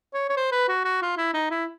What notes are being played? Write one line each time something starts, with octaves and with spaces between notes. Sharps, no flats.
C#5
C#5
C5
B4
F#4
F#4
F4
E4
D#4
E4